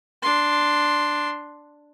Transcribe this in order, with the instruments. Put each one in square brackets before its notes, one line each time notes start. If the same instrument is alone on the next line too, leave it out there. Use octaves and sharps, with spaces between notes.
[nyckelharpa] D4 C6